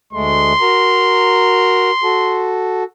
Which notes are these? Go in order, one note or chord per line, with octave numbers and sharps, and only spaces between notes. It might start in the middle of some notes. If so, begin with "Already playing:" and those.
D2 G#3 A3 C6
F#4 A#4 A#5
F#4 A4